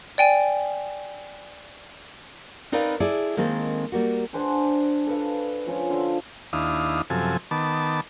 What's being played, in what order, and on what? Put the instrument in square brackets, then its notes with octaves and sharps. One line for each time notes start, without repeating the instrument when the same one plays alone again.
[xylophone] D5 G5 G#5
[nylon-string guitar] C4 D#4 A#4 B4 D5 F5
E4 G#4 A4 D5
D#3 G#3 A#3 C4 A4
G3 A#3 F#4
[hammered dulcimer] D4 G#4 C5 F#5
A4 B4 F5
F3 C#4
D3 A4 F5 C6
[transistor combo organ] D#2 D4 E4 F5 D#6
F#2 C3 F3 A4 G#5
D#3 B3 A5 D6